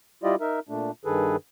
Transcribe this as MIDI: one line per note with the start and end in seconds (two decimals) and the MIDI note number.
0.24 0.36 55
0.24 0.36 64
0.24 0.36 65
0.24 0.36 67
0.24 0.36 74
0.24 0.36 75
0.41 0.60 63
0.41 0.60 70
0.41 0.60 76
0.69 0.91 46
0.69 0.91 57
0.69 0.91 62
1.05 1.36 43
1.05 1.36 51
1.05 1.36 68
1.05 1.36 69
1.05 1.36 71